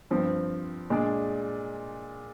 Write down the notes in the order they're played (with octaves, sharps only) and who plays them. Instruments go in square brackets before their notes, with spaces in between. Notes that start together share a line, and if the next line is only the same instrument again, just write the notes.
[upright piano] G2 F3 C4
A#2 G#3 D4 G#4 D5